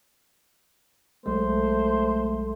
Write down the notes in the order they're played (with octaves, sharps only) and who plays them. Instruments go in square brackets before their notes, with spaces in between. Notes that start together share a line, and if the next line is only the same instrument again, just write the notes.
[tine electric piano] B1 F#3 G#3 [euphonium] A3 [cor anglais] C5